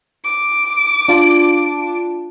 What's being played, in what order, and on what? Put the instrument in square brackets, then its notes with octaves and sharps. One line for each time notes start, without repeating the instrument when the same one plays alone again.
[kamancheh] D6
[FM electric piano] D4 F4 A5